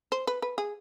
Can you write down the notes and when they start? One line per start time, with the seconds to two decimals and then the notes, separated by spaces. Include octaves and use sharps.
0.12 C5
0.27 B4
0.42 B4
0.58 G#4